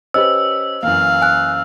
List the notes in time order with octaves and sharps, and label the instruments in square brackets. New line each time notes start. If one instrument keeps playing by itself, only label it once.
[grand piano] C#4 G4 B4 [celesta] C5 D#5 [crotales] E6
[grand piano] F#2 E3 A#3 [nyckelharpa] F5
[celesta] G#5 F#6